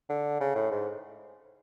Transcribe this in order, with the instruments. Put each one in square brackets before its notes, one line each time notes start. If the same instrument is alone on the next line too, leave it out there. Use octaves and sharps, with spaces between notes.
[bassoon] D3
C#3
A2
G#2